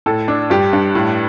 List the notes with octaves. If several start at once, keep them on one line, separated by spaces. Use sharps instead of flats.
A2 A4
D4
G2 G4
G2
A2